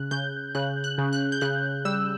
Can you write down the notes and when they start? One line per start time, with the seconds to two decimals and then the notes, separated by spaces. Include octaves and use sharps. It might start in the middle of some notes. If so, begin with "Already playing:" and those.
Already playing: C#3 F#6
0.11 C#3 G6
0.55 C#3 F#6
0.84 F#6
0.98 C#3
1.13 F#6
1.32 G6
1.41 C#3 F#6
1.85 G3 E6